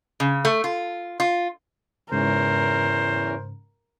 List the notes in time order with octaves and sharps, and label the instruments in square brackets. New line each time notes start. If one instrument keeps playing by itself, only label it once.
[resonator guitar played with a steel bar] C#3
A3
F4
F4
[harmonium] E2 E3 C#4 [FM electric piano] G#2 C#3 [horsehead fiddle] A#4 [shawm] C5